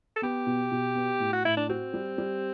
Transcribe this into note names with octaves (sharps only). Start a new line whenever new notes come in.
A4
B3 G4
B2
B2
B3
A2
F#4
A2 E4
D4
C4 F#4
G3
G3